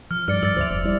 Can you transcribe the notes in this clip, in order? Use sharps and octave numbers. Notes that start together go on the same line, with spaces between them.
F3 F6
G2 D5 F6 C#7
G2 E6 A6
D2 C5 E5 A6 F7
F1
G3 E4 D5